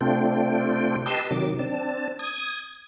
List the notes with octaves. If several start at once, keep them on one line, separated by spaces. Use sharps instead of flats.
C3 A3 C4 D4 F4 G5
G4 B4 D#5 A5 C6 E6
C3 D#3 F#3 D6
C4 D4 A5
D#6 G#6